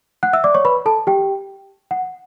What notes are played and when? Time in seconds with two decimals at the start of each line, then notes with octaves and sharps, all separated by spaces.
0.23 F#5 F#6
0.33 E5 E6
0.44 D5 D6
0.54 C#5 C#6
0.65 B4 B5
0.86 A4 A5
1.07 G4 G5
1.91 F#5